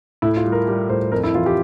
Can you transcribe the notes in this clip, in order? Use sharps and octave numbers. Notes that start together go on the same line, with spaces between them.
A2 E4
F4
G3
A#4
G3
A2 C5
F2 A#4
E4
E3 F4
G4